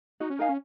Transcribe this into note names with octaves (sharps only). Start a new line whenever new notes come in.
D#4 F#4
C#4
D#4 A#4 F5 G#5
C#4